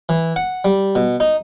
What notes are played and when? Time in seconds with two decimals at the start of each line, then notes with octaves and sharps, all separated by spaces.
0.09 E3
0.36 F#5
0.65 G3
0.95 B2
1.20 D#4